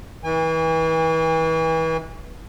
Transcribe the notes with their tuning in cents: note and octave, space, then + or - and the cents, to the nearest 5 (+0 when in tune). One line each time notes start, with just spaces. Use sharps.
E3 -30 G#5 -40